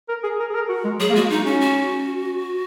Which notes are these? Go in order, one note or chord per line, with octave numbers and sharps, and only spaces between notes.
A#4
G#4
A#4
G#4
A#4
F#4
G#3
F#3 G#4
A#3
G#3 F#4
D#4
C#4 F#4
F#4